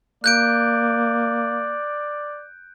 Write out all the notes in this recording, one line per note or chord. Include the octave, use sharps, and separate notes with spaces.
A#3 D5 F#6 G6 D7